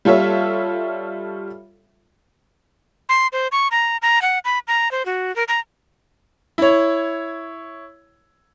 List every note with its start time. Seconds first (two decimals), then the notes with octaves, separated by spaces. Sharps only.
0.05 G3 F4 A4 C#5 E5
3.09 C6
3.33 C5
3.52 C#6
3.71 A#5
4.02 A#5
4.22 F#5
4.45 B5
4.68 A#5
4.91 C5
5.06 F#4
5.36 A#4
5.48 A#5
6.58 E4 C#5